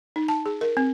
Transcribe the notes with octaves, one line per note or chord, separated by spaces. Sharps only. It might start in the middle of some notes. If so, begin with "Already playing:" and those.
D#4
A5
G#4
A#4
C4